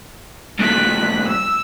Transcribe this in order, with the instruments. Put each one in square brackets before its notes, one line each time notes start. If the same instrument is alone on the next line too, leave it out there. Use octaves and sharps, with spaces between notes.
[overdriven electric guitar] G2 A#2 [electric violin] F#6 B6
[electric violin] E6